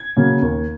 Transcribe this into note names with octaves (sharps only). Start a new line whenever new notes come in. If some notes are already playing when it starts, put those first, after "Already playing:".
Already playing: G#6
C#3 F#3 A#3
D#2